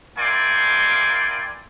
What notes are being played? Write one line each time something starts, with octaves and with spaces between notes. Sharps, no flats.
A#3 E4 D5 G5 G#5 C6